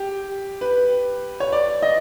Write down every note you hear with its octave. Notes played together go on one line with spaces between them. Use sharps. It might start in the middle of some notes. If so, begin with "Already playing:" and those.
Already playing: G4
B4
C#5
D5
D#5